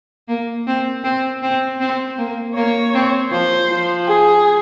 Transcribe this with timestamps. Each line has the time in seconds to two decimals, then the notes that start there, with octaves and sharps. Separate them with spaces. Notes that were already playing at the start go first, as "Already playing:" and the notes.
0.28 A#3
0.67 C4
1.04 C4
1.42 C4
1.80 C4
2.18 A#3
2.55 A#3 C#5
2.94 C4
3.31 F3 C5
3.69 F3
4.08 G#4